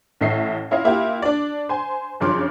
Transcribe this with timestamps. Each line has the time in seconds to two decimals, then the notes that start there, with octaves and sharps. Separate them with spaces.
0.21 A1 A2 D#5 E5 C7
0.71 C#4 E4 F4 D#5 F5
0.84 A#3 E4 F4 G4
1.22 D4 D5
1.69 C5 G#5
2.20 G1 F#2 C#3 F3 C6 D6